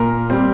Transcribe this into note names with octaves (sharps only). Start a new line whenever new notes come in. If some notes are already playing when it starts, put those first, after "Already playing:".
Already playing: A#2 A#4
G3 C4